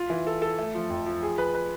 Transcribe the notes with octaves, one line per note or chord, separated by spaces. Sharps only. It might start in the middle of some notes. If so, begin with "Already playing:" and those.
Already playing: F4
E3
A4
A4
A3
F3
F2
F3
G#4
B4
B4